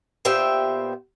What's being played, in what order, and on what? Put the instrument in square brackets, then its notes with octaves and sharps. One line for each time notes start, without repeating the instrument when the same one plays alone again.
[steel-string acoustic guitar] A#2 B3 G4 C5 E5 G5